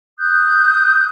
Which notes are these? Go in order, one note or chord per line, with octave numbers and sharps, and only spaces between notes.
D#6 F#6 G6